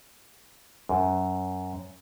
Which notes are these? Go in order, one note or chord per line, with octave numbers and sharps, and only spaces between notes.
F#2